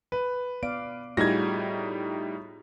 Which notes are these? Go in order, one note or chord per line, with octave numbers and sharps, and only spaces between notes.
B4
B3 D5 F5 D7
A2 G3 D#4 F4 F#4 G#4 G#6 A#6